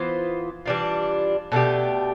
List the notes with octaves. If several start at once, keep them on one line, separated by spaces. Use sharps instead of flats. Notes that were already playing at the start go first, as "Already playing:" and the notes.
Already playing: E3 B3 F4 C5
E3 G3 D4 F4
B2 A3 D4 G4